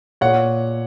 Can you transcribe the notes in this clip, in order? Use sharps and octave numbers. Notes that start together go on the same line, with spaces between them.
A#2 C#5 F#5